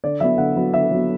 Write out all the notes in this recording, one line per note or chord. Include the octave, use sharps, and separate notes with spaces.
D3 D5
F#3 B3 E4 E5
D3 F#5
F#3 B3 E4
D3 E5
F#3 B3 E4